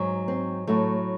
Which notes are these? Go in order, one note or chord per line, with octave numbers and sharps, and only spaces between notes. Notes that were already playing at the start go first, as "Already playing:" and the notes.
Already playing: G#2 F#3
C4
A2 F#3 A3